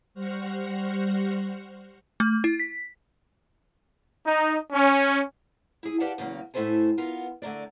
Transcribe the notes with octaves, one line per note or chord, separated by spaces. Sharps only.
G3 C5 F#5 C#6 F6 A#6
A3
E4
B6
D#4
C#4
E4 G#4
G4 B4 D5 F5 F#5 A5
E2 C#3 F#3 A#3
A2 A3 E4 A4 C5 G#5
B3 F4 A#4
D3 A3 A#4 D5